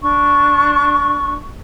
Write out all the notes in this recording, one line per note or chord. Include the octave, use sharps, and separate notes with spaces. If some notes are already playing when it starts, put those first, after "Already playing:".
D4 C#6